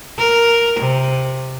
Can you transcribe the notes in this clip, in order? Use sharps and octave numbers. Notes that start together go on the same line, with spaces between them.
A#4
C3